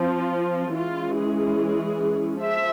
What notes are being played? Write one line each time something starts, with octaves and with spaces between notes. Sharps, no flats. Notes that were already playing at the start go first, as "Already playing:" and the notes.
Already playing: F3 C4 F4
E3 G#3 C#4 F4
G#4
F3 E5